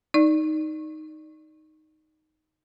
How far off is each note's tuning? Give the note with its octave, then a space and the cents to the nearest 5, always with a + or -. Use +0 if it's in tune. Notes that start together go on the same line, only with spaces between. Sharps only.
D#4 +0 D5 +0